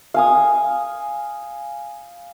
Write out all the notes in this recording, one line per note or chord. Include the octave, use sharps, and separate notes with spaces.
F5 G#5 D#6